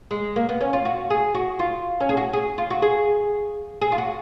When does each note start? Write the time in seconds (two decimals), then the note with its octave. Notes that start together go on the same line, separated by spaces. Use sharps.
0.11 G#3
0.36 A#3
0.49 B3
0.61 C#4
0.73 F4
0.85 F#4
1.10 G#4
1.35 F#4
1.59 F4
2.01 C#4
2.09 G#4
2.17 F#4
2.33 G#4
2.58 F4
2.70 F#4
2.82 G#4
3.81 G#4
3.92 F4
3.98 F#4